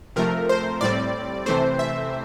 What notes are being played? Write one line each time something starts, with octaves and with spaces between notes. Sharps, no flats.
C3 F3 A3 A#4
C5
A2 G3 C4 D5
C3 E3 A3 C4 C5
E5